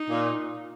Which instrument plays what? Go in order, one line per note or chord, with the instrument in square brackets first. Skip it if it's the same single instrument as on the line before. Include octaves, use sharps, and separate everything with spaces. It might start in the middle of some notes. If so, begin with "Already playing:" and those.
Already playing: [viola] D#4
[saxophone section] A#2